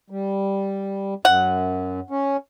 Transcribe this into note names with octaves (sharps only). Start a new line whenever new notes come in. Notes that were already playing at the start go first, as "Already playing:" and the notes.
G3
F#2 F#5
C#4